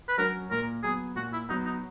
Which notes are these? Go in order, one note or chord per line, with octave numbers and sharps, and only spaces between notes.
B4
F#3 C#4 F#4 A#4
A#2 A#4
F#3 B3 G#4
A#2 F#4
E4
F#3 B3 D#4
D#4